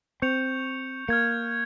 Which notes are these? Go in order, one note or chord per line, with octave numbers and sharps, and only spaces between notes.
C4 C#6 G6 C#7 F7
A#3 F6 G#6 C#7